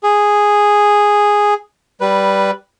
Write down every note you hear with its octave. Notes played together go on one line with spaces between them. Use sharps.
G#4
G3 B4